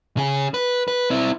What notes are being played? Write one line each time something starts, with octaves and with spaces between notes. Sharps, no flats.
C#3 G#4
B4
B4
C4 E4